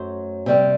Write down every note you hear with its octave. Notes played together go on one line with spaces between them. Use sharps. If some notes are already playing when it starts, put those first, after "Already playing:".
Already playing: F#2 F#3 A3 C5
C3 G3 C4